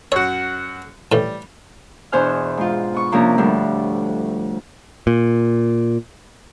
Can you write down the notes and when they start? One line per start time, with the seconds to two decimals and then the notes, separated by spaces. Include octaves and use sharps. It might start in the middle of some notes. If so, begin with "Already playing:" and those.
0.12 F#2 F#4 C#5
1.12 A2 E3 G3
2.12 E2 B2 D4 C5 G#5 F6
2.57 G#2 F4
2.94 B3 C#6
3.12 C3 F3 A#3 C#4 D4 A#4
3.38 D2 A2 F3 G3 D4
5.07 A#2